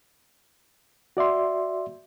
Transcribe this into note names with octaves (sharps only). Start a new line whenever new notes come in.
F#4 D5 E5 C6